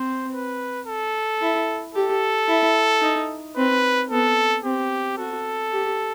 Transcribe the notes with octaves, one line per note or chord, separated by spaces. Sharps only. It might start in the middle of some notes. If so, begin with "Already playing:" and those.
Already playing: C4 C5
B4
A4
E4
G4 A4
E4
D#4
C4 B4
B3 A4
C4 G4
F#4 A4
G4